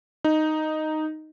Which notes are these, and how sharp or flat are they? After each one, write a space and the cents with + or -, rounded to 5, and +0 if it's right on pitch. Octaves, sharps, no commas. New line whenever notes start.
D#4 -5